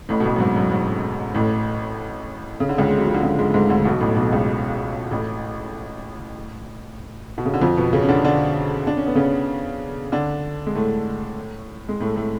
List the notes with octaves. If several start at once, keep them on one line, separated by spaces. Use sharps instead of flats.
A1 A2
B2
A1 A2
F#2
G#2
F#2
G#2
A1 A2
C#3
D3
C#2 C#3
G#3
F#3
F3
D3
C#2 C#3
G#2 G#3
A3
G#2 G#3
D2 D3
B1 B2
A1 A2
B1 B2
C#2 C#3
A1 A2
B2
C#3
D3
F2 F3
B2 B3
C#3 C#4
C#4
D3 D4
D3 D4
D4
C#4
B3
C#3 C#4
D3 D4
G#3
A2 A3
G#3
A2 A3
A2 A3